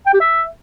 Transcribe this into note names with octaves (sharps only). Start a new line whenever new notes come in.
G5
G4
E5